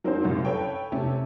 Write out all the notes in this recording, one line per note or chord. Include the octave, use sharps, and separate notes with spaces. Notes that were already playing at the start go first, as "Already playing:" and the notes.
F#3 A#3 C4 D4 D#4 C5
C2 F#2 C#3
A4 B4 C#5 G5
C3 A3 C#4